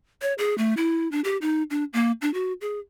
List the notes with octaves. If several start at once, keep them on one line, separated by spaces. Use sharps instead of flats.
C#5
G#4
A3
E4
D4
G4
D#4
D4
A#3
D4
F#4
G#4